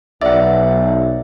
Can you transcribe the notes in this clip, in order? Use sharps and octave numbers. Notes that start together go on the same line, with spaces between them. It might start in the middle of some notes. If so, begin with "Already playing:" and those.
B1 D5 E5 F#5